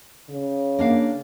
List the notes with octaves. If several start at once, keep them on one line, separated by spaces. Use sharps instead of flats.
C#3
A#3 D4 F5